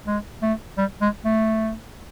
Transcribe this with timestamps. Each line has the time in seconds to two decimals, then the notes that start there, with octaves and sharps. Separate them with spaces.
0.07 G#3
0.42 A3
0.78 G3
1.01 G#3
1.25 A3